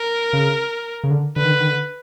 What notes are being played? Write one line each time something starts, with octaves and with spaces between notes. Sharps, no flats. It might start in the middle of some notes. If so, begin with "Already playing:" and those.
Already playing: A#4
C#3
C#3
D3
D3 B4
D#3
D3
D#3
D3